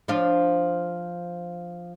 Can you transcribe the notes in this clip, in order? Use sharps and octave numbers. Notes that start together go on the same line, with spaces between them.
F3 D4 F4